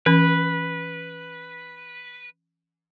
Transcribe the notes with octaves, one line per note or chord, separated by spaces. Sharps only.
E3 C#4 B4